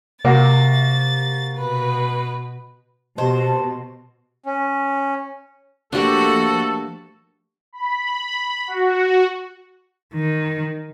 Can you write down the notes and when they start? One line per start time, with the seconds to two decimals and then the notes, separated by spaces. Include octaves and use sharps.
0.25 C3 A#3 F#4 A6
1.57 B2 B4
3.18 B2 G4 C5 D#5 A5
4.46 C#4
5.93 F3 A3 A#3 D4 F#4 G4 A4
7.73 B5
8.67 F#4
10.14 D#3